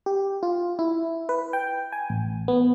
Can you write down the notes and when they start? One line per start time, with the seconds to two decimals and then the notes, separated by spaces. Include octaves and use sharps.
0.06 G4
0.43 F4
0.79 E4
1.29 B4
1.53 G5
1.92 G#5
2.10 A1
2.48 B3